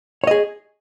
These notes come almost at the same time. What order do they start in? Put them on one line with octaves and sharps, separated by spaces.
C#5 D#5 G#4